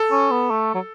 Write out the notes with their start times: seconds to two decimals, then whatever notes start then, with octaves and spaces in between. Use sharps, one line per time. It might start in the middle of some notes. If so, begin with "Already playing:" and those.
Already playing: A4
0.11 C#4
0.31 B3
0.50 A3
0.75 F#3